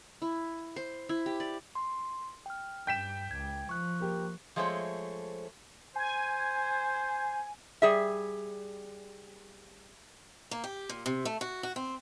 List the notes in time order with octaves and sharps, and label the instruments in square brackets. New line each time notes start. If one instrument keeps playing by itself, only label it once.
[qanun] E4
C5
E4
G4
D5
[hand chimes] C6
G5 F6
[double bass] G2 [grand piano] G5 B6 E7 [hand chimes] G6
[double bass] C#2 [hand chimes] G#6
[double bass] F3 [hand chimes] C#6 F#6
[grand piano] A#3 G4
[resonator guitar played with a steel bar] F3 G#3 A3 C5 C#5
[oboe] C5 [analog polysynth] G#5
[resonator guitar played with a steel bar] G3 G#4 E5
[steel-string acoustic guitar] A#3
G4
A#2
C3
A3
F#4
F#4
C4